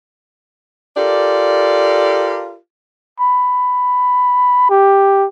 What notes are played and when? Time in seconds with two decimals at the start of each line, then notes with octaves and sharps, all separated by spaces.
0.96 F4 G4 A4 A#4 D5
3.20 B5
4.70 G4